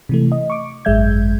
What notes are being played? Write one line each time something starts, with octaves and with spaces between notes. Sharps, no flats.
C3 E3 A3
D#5
C#6 D6
G#1 F#2 G#3 E5 G6 G#6